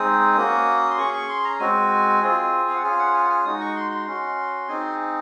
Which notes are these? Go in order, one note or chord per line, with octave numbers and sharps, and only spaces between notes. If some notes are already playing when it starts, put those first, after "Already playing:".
Already playing: G#3 C4 D#4 G#4 D#6
A#3 C#4 F#4
C6
C#4 G#4 C#6
C#6
C6
A#5
G#3 C4 F#4 G#5
C4 F4 G#4
F5
F#5
C#4 F4 G#4 G#5
F#5
G#5
F#5
G#5
G#3 D#4 F#4 D#6
C#6
C6
C6
C#4 F#4
C4 D#4 G#4 G#5